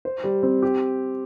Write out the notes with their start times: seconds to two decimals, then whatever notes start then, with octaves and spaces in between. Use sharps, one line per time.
0.05 C5
0.24 G3
0.43 C4
0.62 G4